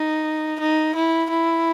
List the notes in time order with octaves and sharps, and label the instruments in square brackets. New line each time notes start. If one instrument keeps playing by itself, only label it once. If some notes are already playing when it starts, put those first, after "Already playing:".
Already playing: [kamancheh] D#4
D#4
E4
E4